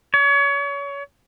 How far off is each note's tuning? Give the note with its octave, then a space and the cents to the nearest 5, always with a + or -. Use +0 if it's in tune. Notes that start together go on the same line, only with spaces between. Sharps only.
C#5 +30